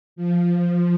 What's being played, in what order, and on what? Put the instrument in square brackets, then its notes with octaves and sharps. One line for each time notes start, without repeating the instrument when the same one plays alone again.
[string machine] F3